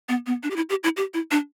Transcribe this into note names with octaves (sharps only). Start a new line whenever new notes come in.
B3
B3
D4
G4
E4
G4
E4
G4
E4
D4